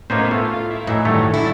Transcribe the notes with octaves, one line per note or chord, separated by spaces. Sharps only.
A2 A#3 B3 C#4 D#4 C5
A3 F4
E4
A2 E3 F#3 D#4
G2 D#3 A3 C#5
D3 F#3 E4 A4